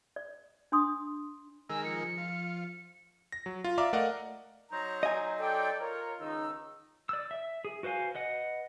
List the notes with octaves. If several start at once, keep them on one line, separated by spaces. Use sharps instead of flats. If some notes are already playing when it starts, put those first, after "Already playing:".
D5
D4 C6 D#6
D#3 G#3 A#4 G#5 E6
F3 C#7
F4
A#6
F#3
F4
D5 E5 F5 A#5 D6
A3 A#4 D5 D#5 F5 F#5
F#3 D#4 C5 C#5 A#5
D#5 G#5
A4 D5 G5
F4 A#4 C#5
C#2 D#3 D#4 E6
D5 E6
E5
G#4
F#4 B4 C5 F5 G#5
B4 D#5 F#5